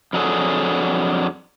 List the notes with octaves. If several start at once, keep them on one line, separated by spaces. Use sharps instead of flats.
F2 F#3 D4 G#4 A4 F#5